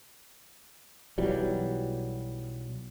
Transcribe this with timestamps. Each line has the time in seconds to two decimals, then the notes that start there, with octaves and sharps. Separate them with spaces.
1.18 B1 E3 F#3 G3